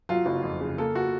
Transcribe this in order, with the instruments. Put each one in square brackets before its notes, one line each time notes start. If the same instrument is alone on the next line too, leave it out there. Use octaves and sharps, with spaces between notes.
[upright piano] F#3 F4
F#1
F2
C#3
A#3 A4
F#4